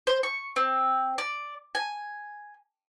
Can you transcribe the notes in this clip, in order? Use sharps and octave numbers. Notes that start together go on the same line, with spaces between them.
C5
C#6
C4
D5
G#5